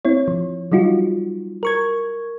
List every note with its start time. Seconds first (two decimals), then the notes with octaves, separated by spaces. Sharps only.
0.05 C4 E4 C#5
0.28 F3
0.72 F#3 G3 D#4 F4 F#4
1.63 A#4 C#6 G#6